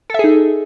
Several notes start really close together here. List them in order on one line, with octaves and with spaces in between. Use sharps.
A4 E5 G#4 D#4